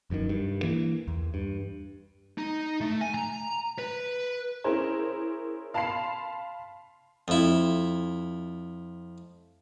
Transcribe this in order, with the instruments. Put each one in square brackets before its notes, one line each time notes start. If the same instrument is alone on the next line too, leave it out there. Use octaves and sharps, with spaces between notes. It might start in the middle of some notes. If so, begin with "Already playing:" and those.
[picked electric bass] F1 F#2 A2 D#3
G2
E3 A#3
E2
G2
[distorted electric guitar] D#4
A3
G#5
A#5
B4
[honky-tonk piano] C#4 E4 G#4 A#4 C5
F5 A5 B5 C6 C7
[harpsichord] F2 E4